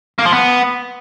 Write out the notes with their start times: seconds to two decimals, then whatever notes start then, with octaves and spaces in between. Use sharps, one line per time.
0.19 A#3
0.25 F3
0.32 B3